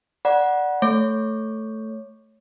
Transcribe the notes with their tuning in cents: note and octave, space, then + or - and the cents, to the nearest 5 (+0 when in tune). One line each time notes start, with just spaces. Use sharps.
D5 +0 F#5 +0 B5 -45
A3 +0 C#5 +0